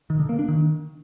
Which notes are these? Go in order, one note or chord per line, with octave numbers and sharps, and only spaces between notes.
D#3
D3
A#3
D4
D#3